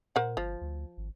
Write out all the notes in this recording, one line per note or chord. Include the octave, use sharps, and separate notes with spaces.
A#2 A#4 C5 F#5
G1 F3
D2
G#1